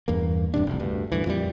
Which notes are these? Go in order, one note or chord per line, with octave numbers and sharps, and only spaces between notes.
E2 G2 A#3
E1 G2 C3 D4
F1 C2
D2 G2
D2 G2 E3
F2 A#2 E3 G3